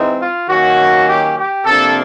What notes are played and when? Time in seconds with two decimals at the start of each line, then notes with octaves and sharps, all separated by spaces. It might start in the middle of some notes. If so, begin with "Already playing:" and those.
Already playing: E3 G#3 C4 D#4
0.20 F4
0.48 D#3 F#3 A#3 C#4 F#4
1.07 G4
1.36 G4
1.65 C3 F3 A#3 D4 A4